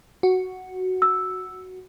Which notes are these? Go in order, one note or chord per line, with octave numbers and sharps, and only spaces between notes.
F#4
E6